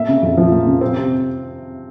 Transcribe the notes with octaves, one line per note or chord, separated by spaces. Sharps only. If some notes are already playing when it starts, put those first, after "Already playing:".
Already playing: A#3 E5
C#3
F2
F3
A#3
C#3
C4
C3